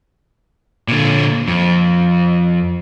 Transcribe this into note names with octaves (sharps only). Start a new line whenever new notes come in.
A#2 D3
F2